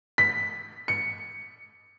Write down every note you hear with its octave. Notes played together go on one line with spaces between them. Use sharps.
B6
C#7